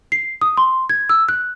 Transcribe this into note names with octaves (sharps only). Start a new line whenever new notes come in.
C7
D#6
C6
G#6
E6
F#6